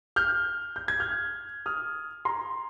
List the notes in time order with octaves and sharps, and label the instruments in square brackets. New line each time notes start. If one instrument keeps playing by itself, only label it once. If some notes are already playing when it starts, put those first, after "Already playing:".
[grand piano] F6 G6
G6
G#6
F6 G6
D#6 F6
A#5 C6